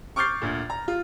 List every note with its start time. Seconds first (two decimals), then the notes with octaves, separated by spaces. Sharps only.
0.16 C#6 D6 F6 G6 A6 C7
0.42 D2 A#2
0.70 A#5
0.88 F4